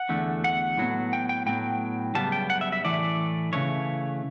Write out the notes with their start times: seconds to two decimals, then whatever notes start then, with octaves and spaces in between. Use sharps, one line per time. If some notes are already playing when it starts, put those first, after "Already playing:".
Already playing: F#5
0.09 E2 D3 A3
0.44 F#5
0.78 A2 F#3 B3
1.13 G5
1.29 G5
1.46 A2 F#3 B3 G5
2.15 F#2 C#3 G3 B3 A5
2.32 G5
2.50 F#5
2.61 E5
2.72 E5
2.84 A2 E3 A3 D5
3.53 C#3 E3 A3 C#5